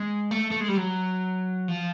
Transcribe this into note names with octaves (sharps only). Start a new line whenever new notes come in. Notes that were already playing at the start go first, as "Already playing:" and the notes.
Already playing: G#3
A3
A3
G#3
G3
F#3
F3